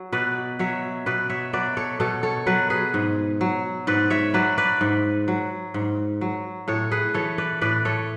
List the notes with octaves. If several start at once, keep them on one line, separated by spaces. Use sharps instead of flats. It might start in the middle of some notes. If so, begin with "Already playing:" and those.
Already playing: F#3
B2 B4 D5
F#3 C#5 E5
B2 B4 D5
C#5 E5
F#3 B4 D5
A4 C#5
B2 A4 C#5
A4 C#5
F#3 B4 D5
G#4 B4
G#2
F#3
G#2 B4 D5
C#5 E5
F#3 B4 D5
B4 D5
G#2
F#3
G#2
F#3
A2 A4 C#5
G#4 B4
E3 A4 C#5
B4 D5
A2 B4 D5
A4 C#5